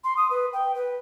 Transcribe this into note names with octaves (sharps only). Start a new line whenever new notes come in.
C6
D#6
B4
G5
B4